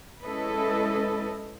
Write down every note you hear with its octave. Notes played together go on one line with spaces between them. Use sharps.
G#3 C#4 E4 A4 B4 D#5